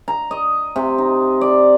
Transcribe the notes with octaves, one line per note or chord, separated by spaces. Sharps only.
A#5
D#5
C3
D#4
D5